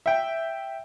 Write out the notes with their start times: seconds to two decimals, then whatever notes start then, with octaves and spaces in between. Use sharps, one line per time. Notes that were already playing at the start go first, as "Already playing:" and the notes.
0.06 E5 G5